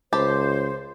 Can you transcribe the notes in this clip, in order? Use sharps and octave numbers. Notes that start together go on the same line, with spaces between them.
C#2 G4 C5 A5 B5